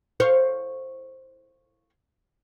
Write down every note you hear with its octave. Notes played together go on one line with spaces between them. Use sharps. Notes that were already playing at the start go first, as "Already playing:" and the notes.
C5 C#5 F5